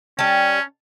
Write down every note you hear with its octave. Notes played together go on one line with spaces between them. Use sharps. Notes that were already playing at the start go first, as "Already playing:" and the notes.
G3 C#4 A5